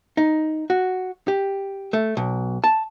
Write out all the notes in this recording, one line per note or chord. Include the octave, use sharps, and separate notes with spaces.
D#4
F#4
G4
A3
B1
A5